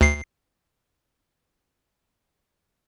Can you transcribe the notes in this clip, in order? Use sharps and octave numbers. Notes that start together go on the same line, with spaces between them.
D2 C7